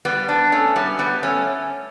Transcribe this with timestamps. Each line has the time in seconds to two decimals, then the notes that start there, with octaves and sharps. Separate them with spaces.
0.05 G3 B3
0.28 B3 D4
0.52 A3 C#4
0.76 G3 B3
0.99 G3 B3
1.23 A3 C#4